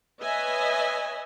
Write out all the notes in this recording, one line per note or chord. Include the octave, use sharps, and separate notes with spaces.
B4 C#5 D#5 E5 G#5